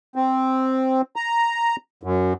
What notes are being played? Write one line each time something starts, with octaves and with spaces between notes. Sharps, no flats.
C4
A#5
F#2